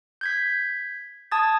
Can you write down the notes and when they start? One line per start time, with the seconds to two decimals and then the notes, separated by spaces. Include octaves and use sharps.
0.21 G6 G#6 B6
1.32 A5 D#6 G#6 A6